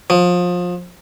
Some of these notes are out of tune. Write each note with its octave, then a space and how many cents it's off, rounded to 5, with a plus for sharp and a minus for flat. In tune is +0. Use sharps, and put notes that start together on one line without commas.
F3 +25